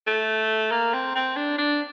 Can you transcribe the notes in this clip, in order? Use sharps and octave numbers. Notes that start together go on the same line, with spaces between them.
A3
A#3
C4
C4
D4
D4